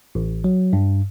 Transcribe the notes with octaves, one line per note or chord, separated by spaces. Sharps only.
A1
F#3
G2